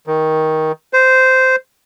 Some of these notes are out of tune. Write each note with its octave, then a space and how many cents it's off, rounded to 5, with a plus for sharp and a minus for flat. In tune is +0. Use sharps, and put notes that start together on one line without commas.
D#3 +15
C5 -10